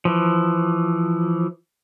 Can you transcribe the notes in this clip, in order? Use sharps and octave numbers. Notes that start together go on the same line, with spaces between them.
E3 F3